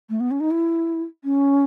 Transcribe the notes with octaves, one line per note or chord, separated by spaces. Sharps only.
A3
B3
C#4
D#4
E4
C#4